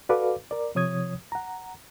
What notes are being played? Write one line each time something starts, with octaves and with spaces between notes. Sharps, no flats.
F#4 A4 B4 D5 F5 D6
A#4 D5
C3 F3 C#5 D#6 G#6
F#5 A#5